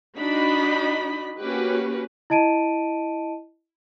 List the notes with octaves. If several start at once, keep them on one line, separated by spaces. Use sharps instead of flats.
D4 D#4 F#4 D#5 B5
A#3 C#4 F#4 G4 B4
E4 D#5 A5 D7 D#7